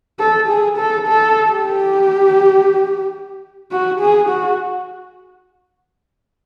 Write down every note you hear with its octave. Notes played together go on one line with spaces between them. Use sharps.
A4
G#4
A4
A4
G4
F#4
G#4
F#4